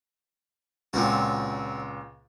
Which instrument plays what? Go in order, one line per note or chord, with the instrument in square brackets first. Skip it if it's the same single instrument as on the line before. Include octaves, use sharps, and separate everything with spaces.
[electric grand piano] C#2 A#2 [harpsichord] F#3 C4 F#4